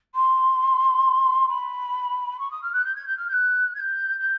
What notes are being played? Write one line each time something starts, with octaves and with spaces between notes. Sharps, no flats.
C6
B5
C#6
D#6
F6
F#6
G6
G#6
G6
F6
G6
F#6
G#6
G6
G6